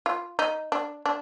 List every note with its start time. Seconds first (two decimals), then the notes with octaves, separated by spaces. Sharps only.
0.06 F4
0.39 D#4
0.72 D4
1.06 D4